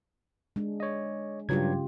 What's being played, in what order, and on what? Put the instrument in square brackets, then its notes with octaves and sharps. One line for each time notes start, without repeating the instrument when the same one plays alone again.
[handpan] G#3 D4
[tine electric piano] C#5 D#5
[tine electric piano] G2 F#3 G#6 [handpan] C#3 F4 G4